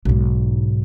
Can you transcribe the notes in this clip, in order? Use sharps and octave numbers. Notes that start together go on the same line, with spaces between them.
B1 G#2